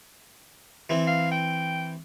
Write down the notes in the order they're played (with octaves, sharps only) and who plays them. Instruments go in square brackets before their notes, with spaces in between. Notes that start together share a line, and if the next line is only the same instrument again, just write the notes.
[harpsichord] E3 C4 E4
[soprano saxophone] F5
G5